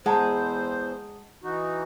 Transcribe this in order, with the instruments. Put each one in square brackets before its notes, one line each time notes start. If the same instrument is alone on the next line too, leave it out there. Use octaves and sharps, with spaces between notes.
[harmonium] E2 C5 [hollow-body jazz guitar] G#3 [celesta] F#5 A5 A#5
[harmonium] E3 D#4 F#4